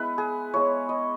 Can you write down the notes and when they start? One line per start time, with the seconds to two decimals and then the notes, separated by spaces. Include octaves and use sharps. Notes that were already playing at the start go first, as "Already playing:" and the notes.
Already playing: G#3 B3 E4 B4
0.18 G#4
0.54 G#3 B3 E4 C#5
0.89 D#5